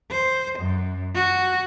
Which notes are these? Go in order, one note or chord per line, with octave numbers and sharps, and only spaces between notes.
C5
F#2
F#4